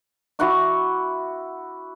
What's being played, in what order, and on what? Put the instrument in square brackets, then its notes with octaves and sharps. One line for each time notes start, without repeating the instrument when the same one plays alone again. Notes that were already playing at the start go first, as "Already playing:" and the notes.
[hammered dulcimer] E4 F#4 F#5 D6